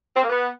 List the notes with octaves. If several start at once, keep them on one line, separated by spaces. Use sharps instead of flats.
C4
A#3
B3